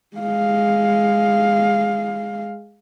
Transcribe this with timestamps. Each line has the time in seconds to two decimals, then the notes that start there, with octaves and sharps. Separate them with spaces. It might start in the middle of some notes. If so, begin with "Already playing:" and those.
0.17 G#3 F5